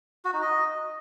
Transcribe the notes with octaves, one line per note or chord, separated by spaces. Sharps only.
F#4
D#4
D#5